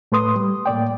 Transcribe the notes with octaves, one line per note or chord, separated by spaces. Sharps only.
A2 A3 B4 C6 D#6
G3
A2 A#3 D5 G5